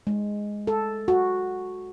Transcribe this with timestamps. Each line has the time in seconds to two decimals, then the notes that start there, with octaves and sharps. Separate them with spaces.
0.07 G#3
0.67 A4
1.08 F#4